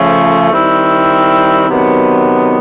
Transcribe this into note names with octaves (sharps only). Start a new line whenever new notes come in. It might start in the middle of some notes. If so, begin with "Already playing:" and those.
Already playing: C#3 F3 A3
D#3 G3 C4 E4
C3 D#3 F#3 B3